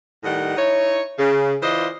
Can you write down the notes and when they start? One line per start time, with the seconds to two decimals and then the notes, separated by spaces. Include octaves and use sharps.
0.24 A2 D#3 G3 D#5 F#5
0.57 D#4 E4 C#5
1.18 C#3
1.62 E3 F4 C5 D5 D#5